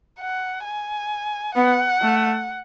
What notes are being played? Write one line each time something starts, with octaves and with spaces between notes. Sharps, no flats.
F#5
G#5
B3 F#5
A3